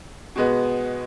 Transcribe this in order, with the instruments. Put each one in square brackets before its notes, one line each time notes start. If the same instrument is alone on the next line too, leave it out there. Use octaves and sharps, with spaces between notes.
[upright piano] B2 G#3 B3